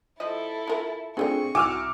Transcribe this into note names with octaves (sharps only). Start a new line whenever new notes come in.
F3 E4 A4 D#5 E5
F4 A#4
F3 A3 C4 D4 F4 G#4 C#6
C2 F#4 G#5 D6 E6 F6 E7